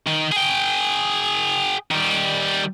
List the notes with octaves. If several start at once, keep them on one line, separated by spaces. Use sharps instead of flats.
D#3
G#4 G5
D#3 G3